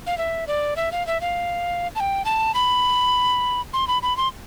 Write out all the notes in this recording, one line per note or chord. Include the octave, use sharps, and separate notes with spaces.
F5
E5
D5
E5
F5
E5
F5
A5
G5
A5
B5
C6
B5
B5
C6